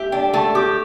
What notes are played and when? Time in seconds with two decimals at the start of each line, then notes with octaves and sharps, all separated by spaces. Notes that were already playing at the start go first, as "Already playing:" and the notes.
Already playing: G4 E5
0.12 D4 G5
0.34 A3 A5
0.55 G4 D6